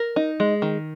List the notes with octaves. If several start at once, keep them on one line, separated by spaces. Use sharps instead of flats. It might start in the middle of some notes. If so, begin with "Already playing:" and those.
Already playing: A#4
D#4
G#3
D#3